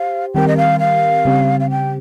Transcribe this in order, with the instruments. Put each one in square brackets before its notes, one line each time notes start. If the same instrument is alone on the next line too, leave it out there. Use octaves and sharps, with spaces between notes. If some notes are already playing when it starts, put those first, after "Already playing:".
Already playing: [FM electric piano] G4 C5 [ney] F5
[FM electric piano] D#3 G3 C4 G4 A#4 [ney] G5
[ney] D#5
F5
F5
[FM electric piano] C#3 G3 C4 G4
[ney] F5
G5